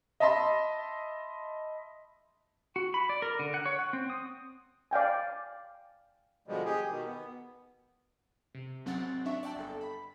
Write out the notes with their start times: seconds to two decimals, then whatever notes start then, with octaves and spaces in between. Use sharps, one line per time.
0.20 D#5 E5 A5 B5 C6
2.76 F#4
2.94 B5
3.09 D5
3.22 A#4
3.39 D3
3.54 F#5
3.66 C#5
3.79 F#5
3.93 C4
4.10 D#6
4.91 D5 F5 G5 G#5
6.47 B2 D3 F3 G3 G#3
6.65 G4 G#4
6.89 B2 D#3
7.07 B3
8.55 C3
8.85 G#1 F#3 C4 F#5 A6
9.25 F#3 D4 E5 C#6
9.43 D5 F#5 G5 A5
9.56 G1 A4
9.81 B5